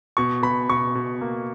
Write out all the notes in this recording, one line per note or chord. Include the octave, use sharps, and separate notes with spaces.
B2 C#6
B2 B5
B2 C#6
B2
A#3